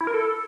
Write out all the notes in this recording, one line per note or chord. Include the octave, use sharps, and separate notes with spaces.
E4
A#4
A4